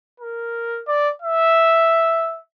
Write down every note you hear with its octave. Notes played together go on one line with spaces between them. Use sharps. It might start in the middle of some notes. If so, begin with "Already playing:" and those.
A#4
D5
E5